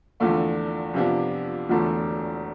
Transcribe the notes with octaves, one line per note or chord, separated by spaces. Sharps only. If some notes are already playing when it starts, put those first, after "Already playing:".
E2 D3 F3 A3 D4
F2 C3 F3 B3 D4
E1 E2 D3 A3 D4